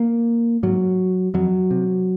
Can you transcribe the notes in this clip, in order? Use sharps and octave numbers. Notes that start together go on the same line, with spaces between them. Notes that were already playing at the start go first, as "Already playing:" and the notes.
Already playing: A#3
G#2 F#3
F2 F#3
C3